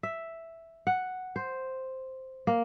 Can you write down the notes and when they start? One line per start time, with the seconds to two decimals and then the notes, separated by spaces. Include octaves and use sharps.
0.03 E5
0.87 F#5
1.36 C5
2.47 A#3